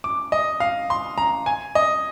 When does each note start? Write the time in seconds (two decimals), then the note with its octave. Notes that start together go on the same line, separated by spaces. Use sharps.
0.04 D6
0.32 D#5
0.60 F5
0.90 C6
1.18 A#5
1.46 G#5
1.75 D#5